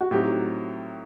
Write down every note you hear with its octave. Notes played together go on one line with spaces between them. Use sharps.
F#4
A2 F#3 C4 D#4 G4